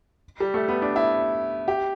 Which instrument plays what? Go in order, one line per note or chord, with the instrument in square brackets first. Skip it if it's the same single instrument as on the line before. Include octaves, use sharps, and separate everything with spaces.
[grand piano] G3
A3
B3
D4
E4
G4